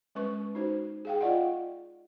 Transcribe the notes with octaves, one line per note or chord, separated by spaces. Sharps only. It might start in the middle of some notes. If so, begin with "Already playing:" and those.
G#3 C#4 B4 C#6
D#4 F#4 C5
G#4 F5 G5
F4 D5 D#5 F5 F#5